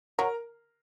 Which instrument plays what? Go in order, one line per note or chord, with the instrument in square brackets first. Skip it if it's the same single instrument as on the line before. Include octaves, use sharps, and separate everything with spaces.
[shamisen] F#3 [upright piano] A#4 A#5